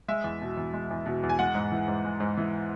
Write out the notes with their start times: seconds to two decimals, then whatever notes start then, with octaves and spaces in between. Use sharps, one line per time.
0.08 G#3 E5
0.24 E2
0.41 B2
0.57 E2
0.73 G#3
0.91 E2
1.06 B2
1.23 E2
1.29 G#5
1.39 G#3 F#5
1.55 G#2
1.72 E3
1.88 G#2
2.05 G#3
2.20 G#2
2.37 E3